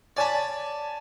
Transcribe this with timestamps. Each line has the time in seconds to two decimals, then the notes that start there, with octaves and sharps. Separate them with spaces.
0.17 C#5 D5 G#5 A5 B5